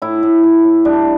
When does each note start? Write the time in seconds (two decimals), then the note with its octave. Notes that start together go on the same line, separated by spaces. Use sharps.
0.02 A2 E4
0.23 A2
0.44 A2
0.65 A2
0.85 G3 D4